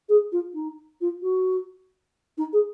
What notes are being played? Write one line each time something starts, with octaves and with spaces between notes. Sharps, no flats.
G#4
F4
D#4
F4
F#4
D#4
G#4